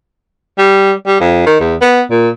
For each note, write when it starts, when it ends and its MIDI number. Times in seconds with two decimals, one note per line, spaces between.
0.58 0.92 55
1.07 1.18 55
1.20 1.44 41
1.46 1.60 51
1.60 1.75 40
1.81 2.01 59
2.10 2.29 46